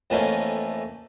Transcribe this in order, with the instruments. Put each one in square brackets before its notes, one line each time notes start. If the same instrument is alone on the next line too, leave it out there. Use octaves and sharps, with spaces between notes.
[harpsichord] F2 E3 A3 A#3 C#4 D#4